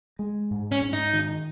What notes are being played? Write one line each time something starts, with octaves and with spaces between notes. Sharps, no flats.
G#3
G#2
C#4
G#2
D#4
D#3